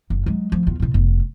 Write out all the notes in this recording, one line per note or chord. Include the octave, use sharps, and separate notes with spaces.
F#1
F#3 G#3
F3 A3
E2 F4
A2 C3
F1 B3